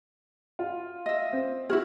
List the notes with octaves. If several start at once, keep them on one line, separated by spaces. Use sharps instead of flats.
F4
D#5 E5
C4
E4 F#4 G#4 F6